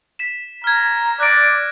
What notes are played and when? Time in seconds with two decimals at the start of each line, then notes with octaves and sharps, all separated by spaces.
0.19 B6 E7
0.64 A#5 F6 G#6
1.20 D5 F#6 A#6 D7